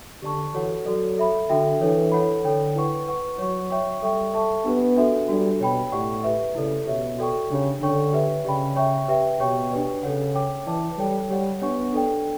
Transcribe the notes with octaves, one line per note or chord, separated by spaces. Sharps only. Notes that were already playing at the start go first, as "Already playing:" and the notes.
D3 G4 D5 A5 C#6
E3 F#4 A4 C#5 F#5
F#3 F#4 A4 D5
A4 E5 B5
D3 D4 F#4 A4 E5 G5
E3 D4 A4 C#5
E4 A4 C#5 F#5 B5
D3 A4 C#5 G5
E4 B4 F#5 C#6
B4 F#5 C#6
F#3 C#5 F#5 C#6
C#5 E5 G5 C#6
G3 A4 E5 G5 C#6
A4 E5 A5 C#6
B3 D4 G4 B4
D4 F#4 A4 E5
G3 D4 F#4 A4
B2 C#5 G5 B5
A2 G4 D5 F#5 C#6
G4 B4 E5
C#3 E4 A4 D5
B2 G4 C#5 E5
F#4 A4 D5 G5 C#6
C#3 D4 G4 C#5
D3 D4 A4 C#5 G5 C#6
G4 B4 E5
C#3 G4 D5 G5 B5
C#5 E5 G5 C#6
G4 B4 E5 G5
B2 G4 C#5 G5 C#6
D4 G4 B4 D5
C#3 A4 C#5 F#5
C#5 G5 D6
E3 E4 B4 D5 A5 D6
G3 A4 C#5 G5
G3 G4 C#5 F#5
B3 D4 G4 C#5 F#5 C#6
D4 A4 D5 G5